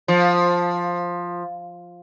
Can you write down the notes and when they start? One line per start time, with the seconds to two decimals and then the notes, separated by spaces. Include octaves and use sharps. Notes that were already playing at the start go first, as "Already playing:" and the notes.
0.08 F3